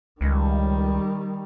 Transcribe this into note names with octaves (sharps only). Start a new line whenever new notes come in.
C#2 D#3 G3